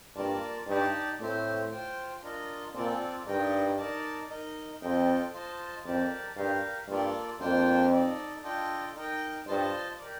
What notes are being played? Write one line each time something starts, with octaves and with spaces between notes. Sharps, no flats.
G2 A#3 F4 A#4 D5 A5
G2 D#4 G4 D5 A5
A2 A3 C4 G4 C5
F4 C5 G5
D4 F4 A#4 D#5
A#2 C4 F4 A4 D5
G2 D#4 A#4 D#5 G5
D#4 A#4 D5 A5
D#4 A#4 D#5
F2 F4 A4 D#5 G5
F4 C5 D#5 A5
F2 G4 A#4 D5 A5
G2 G4 A#4 F5
G2 A#3 F4 A4 D5
F2 A#3 D4 F4 C5 G5
D#4 A4 D5
D4 F4 A4 D#5 G5
D#4 A#4 D#5 G5
G2 F4 C5 D#5 A5
G4 A#4 D5